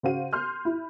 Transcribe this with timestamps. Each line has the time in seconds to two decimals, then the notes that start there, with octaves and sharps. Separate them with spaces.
0.03 C#3 F#4 C5 F5 D#7
0.33 C6 F6 G6
0.65 E4